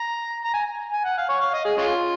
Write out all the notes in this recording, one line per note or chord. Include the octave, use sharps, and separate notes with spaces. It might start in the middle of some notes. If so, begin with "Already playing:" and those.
Already playing: A#5
A#5
G#5
G#5
F#5
F5
C#5
F5
D#5
G#4
G#3 C#4 F4